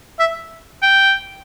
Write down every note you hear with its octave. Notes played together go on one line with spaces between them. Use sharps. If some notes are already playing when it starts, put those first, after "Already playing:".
E5
G5